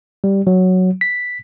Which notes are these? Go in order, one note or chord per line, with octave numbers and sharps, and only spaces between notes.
G3
F#3
B6